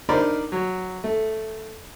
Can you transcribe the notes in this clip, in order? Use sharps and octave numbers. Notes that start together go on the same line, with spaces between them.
D4 D#4 A#4 C5 D5 B5
F#3
A3